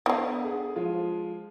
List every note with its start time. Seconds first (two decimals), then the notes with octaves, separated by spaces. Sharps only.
0.06 D3 E3 B3
0.45 G#4
0.75 F3 G#3 F4